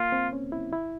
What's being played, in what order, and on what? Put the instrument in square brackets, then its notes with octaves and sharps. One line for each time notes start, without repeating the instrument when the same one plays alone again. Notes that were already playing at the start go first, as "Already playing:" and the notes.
Already playing: [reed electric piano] A#3 [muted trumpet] F4
[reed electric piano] C4
C#4
E4
E4